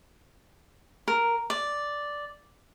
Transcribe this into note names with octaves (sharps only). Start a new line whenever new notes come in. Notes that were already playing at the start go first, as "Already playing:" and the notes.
A#4
D5